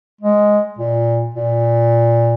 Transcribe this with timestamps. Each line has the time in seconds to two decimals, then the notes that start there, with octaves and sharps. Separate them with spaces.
0.21 G#3
0.78 A#2
1.35 A#2